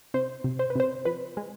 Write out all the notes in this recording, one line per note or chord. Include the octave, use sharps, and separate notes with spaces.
C3 C5
C3
C5
B4
C3 C5
F3 B4
G#3